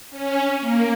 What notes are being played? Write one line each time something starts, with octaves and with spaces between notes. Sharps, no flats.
C#4
A#3